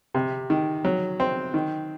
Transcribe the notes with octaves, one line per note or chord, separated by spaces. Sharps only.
C3
D#3
F#3
C4
D#3